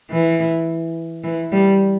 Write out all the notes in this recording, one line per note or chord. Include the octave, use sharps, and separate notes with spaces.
E3
E3
G3